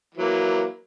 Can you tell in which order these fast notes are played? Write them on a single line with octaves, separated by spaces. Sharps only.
E3 F#3 A#3